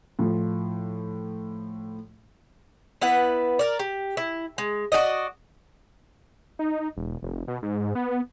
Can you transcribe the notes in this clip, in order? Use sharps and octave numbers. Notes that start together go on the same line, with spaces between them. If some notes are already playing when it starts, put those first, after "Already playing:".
A2 F3
B3 E4 B4 F#5
A#4 D5
G4
E4
G#3
F#4 G4 D5 D#5
D#4
E1
F1
B2
G#2
B3